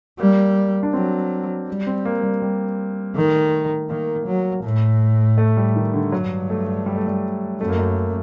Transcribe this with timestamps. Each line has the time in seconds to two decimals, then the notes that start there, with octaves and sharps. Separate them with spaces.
0.19 G3 A#3
0.83 D4
0.93 F#3 C4
1.68 G3
1.87 C4
2.05 A#3
2.23 G3
2.42 G3
3.16 D#3 A3
3.90 D#3 A#3
4.27 F#3
4.64 A2
5.38 A3
5.57 G3
5.76 D#3
5.94 D3
6.12 G2 F#3
6.50 A3
6.86 G3
6.96 A3
7.07 G3
7.61 F#2 A3
7.69 A#3
7.78 A3